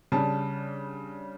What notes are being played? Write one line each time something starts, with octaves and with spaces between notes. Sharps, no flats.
C#3 G3 D4 A5